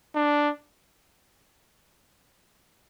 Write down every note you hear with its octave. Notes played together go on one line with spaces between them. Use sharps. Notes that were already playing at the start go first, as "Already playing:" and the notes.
D4